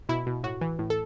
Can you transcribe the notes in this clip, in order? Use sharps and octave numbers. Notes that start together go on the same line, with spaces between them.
B2 E4
B2
A2 F#4
E3
A2
A4